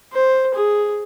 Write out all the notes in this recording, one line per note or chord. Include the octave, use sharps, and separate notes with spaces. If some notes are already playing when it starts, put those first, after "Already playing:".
C5
G#4